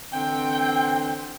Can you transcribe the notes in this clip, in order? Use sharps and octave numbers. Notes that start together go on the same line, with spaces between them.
D3 E3 C4 G5